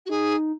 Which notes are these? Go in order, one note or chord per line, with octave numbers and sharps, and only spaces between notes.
F#4
D#4 G#4